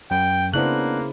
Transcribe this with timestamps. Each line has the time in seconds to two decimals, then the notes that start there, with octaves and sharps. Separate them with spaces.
0.11 F#2 G5
0.54 C#3 A#3 B3 D4 E4 C5 F#6